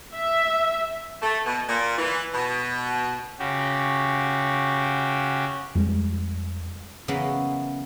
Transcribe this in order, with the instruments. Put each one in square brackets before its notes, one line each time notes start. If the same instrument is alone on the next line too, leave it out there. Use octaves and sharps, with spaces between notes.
[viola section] E5
[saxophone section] A3
B2
A#2
E3
B2
[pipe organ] C#3 F#4 G4
[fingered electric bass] F2 G3 G#3
[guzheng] C#3 E3 F#3 A#3 B3 C#4